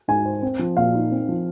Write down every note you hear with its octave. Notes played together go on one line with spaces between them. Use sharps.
G#2 G#5
C5
C4
F3
A#2 F5
D#4
C4
F3